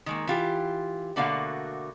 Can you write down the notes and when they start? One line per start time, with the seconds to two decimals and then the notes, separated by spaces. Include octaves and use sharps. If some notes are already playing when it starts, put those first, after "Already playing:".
0.06 D#3 G#3 A#3
0.27 E3 F4 G4
1.16 B2 D3 A3 A#3 F#4 F5